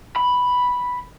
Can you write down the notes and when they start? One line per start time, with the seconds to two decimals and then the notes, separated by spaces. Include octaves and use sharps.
0.16 B5